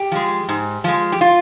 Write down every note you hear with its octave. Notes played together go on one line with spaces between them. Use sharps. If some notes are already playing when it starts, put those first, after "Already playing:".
Already playing: G4
F3 G#3
G#2
F3 G#3
G4
F4